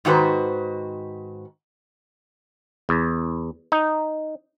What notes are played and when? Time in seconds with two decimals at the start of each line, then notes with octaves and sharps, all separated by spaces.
0.05 G#2 D#3 F#4 B4 C5
2.89 E2
3.72 D#4